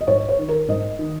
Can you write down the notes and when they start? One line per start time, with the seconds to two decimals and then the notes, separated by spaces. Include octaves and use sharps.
0.01 D#5
0.07 G#2 C#5
0.29 C#5
0.39 D#3
0.49 A#4
0.68 G#2 D#5
0.99 D#3